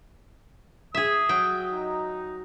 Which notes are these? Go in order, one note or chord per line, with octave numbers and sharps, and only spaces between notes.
G#4 E5 D#6
F#3 G5
D#4